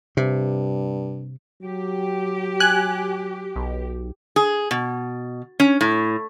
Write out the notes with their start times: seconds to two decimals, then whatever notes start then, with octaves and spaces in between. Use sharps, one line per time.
0.17 G2 C3
1.63 F#3 G4
2.60 G#5 F#6
3.56 B1
4.36 G#4
4.71 B2
5.60 C#4
5.81 A2